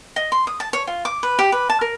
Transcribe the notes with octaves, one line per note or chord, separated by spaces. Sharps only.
D#5
C6
D#6
A5
C#5
F4
D6
B4
G4
B4
A5
A#4